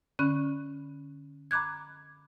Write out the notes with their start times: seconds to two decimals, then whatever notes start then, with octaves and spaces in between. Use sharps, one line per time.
0.19 D3 C#4 B5 F#6
1.51 A#5 B5 D6 F#6 G#6